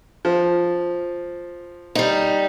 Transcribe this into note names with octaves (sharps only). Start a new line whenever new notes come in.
F3
G3 D#4